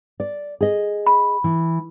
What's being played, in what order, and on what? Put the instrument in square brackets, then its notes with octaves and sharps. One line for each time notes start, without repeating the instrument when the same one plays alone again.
[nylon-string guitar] D5
G#4 D#5
[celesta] B5
[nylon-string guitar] E3